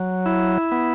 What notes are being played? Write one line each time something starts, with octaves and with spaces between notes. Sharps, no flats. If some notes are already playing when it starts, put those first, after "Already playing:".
Already playing: F#3
E4
B3